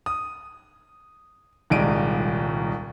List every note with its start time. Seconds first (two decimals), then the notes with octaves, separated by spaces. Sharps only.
0.06 D#6
1.70 D#1 C2 G#3 D7 D#7